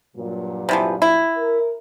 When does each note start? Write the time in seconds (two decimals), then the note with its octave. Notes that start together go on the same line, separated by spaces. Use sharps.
0.16 G2 A#2 F#3
0.69 C3 E3 F3
1.02 E4
1.37 A#4